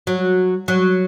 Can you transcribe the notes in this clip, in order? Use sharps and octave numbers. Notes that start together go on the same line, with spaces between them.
F#3
F#3